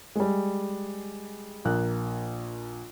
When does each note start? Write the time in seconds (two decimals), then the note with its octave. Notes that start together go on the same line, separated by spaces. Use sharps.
0.15 G3 G#3
1.65 A#1 A#3 F#6